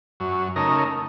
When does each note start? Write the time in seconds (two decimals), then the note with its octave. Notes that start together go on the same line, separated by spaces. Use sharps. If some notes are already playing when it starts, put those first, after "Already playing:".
0.20 F#2
0.56 C#3 A3 D#4 A#4